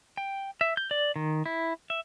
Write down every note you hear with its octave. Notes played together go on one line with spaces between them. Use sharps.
G5
E5
G6
D5
D#3
E4
E5